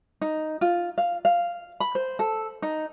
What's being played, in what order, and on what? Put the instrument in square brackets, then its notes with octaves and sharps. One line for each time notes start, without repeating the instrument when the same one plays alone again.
[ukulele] D#4
F4
F5
F5
B5
C5
A4
D#4